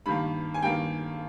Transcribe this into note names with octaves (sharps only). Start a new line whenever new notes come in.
G2 D#3 A#3 B5
G#5
G2 D#3 A#3 G5